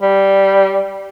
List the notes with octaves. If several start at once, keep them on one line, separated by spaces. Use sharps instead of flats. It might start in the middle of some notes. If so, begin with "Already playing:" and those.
G3